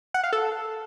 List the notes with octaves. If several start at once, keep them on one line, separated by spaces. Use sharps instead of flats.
F#5
F5
A4